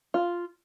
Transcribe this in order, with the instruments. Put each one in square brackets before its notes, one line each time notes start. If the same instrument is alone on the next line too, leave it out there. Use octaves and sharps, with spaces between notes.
[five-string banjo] F4